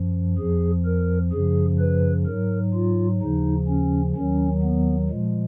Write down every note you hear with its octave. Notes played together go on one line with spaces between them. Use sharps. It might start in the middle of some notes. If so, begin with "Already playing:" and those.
Already playing: F#2 F3
F2 F3 G#4
A#4
F#2 C#3 F3 G#4
B4
G#2 F#3 A#4
F4
D#2 C#3 F3 D#4
C#4
D#2 D#3 F#3 C#4
B3
A#2 F3 G#3